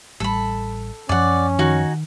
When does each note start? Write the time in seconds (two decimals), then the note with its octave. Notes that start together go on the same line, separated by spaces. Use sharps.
0.20 A1 G3 A4 B5
1.09 F#2 F3 C#4 D5 F#5
1.59 D#3 D#4 F#4 G#5